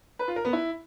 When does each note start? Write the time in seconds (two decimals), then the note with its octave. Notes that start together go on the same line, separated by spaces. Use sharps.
0.19 B4
0.28 F4
0.36 A#4
0.45 B3
0.53 E4